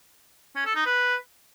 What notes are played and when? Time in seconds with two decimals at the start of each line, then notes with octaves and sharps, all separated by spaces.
0.55 C#4
0.66 A4
0.76 D#4
0.86 B4